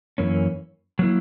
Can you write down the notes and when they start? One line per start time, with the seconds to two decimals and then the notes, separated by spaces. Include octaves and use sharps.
0.18 F#2 E3 A#3 C#4
0.99 F#3 A#3 E4